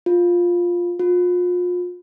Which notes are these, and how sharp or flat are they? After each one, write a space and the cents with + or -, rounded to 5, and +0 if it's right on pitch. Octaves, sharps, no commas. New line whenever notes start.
F4 +5
F4 +35